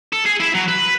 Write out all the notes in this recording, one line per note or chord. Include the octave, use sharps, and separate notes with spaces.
A4
G#4
E4 E5
F#3
B4